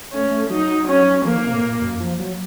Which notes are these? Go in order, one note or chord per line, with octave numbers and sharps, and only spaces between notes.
A3 C#4
A3
F#3 D#4
C#4
F3 A#3
D#3
C3
A2
A#2
F#2
F3
F#3